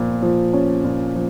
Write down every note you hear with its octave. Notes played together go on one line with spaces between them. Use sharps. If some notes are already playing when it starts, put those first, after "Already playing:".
Already playing: A#2 F3
F3
C#4
A#2
F3